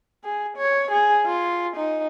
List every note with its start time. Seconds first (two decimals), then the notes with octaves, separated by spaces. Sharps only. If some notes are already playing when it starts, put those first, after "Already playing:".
0.24 G#4
0.57 C#5
0.91 G#4
1.26 F4
1.76 D#4